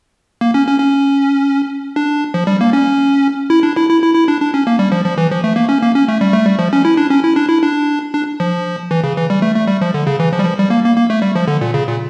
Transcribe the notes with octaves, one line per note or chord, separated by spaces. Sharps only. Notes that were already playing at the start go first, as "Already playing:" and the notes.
A#3
C#4
C#4
C#4
D4
F3
G3
A#3
C#4
E4
D4
E4
E4
E4
E4
D4
D4
C#4
A#3
G3
F3
F3
E3
F3
A3
A#3
C#4
A#3
C#4
A3
G3
A3
G3
F3
C#4
E4
D4
C#4
E4
D4
E4
D4
D4
F3
E3
C#3
E3
G3
A3
A3
G3
F3
D3
C#3
E3
F3
G3
F3
G3
A#3
A#3
A#3
A3
G3
F3
D3
A#2
C#3
A#2